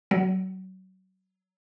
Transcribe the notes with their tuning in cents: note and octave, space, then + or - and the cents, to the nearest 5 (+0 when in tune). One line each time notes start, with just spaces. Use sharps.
F#3 +25